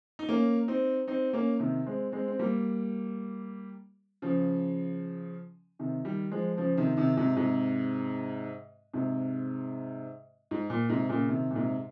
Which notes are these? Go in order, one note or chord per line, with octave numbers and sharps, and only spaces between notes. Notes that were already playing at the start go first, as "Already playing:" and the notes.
D#4
A#3 C#4
C4 D#4
C4 D#4
A#3 C#4
C3 D#3
G#3 C4
G#3 C4
C4
G3 A#3
C#3 F3
C3 D#3
D#3 G3
F3 G#3
C#3 F3
C3 D#3
C3 D#3
G#2 C3
G#2 C3
G#2 C3
G#2
A#2
G#2 C3
A#2 C#3
C3 D#3
A#2
G#2 C3